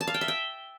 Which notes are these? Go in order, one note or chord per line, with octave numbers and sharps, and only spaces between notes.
A5
F5
G5
E5
G5